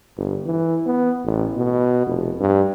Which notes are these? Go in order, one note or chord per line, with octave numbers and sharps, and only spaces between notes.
G1
E3
B3
A1
B2
F1
G2